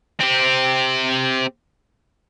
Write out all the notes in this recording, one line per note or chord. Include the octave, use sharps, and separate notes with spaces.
C4 G4